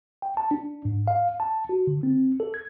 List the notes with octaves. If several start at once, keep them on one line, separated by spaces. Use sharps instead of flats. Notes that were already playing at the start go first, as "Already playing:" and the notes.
G5
A5
D4
G#2
F5
A5
F#4
D3
C4
A4
G#6